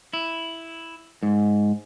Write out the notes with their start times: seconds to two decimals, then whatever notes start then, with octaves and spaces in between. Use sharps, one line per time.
0.13 E4
1.23 G#2